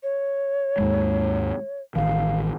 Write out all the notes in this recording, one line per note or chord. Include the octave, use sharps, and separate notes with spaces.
C#5
D#2 G#2 G#3
A1 D#3 F5